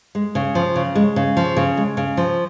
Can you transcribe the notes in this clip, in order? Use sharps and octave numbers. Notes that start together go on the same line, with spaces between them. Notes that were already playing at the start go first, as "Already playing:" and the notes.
G#3
C#3
F3
C#3
G#3
C#3
F3
C#3
G#3
C#3
F3